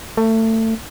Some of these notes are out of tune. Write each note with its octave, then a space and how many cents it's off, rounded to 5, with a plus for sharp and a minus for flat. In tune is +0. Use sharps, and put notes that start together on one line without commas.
A3 +25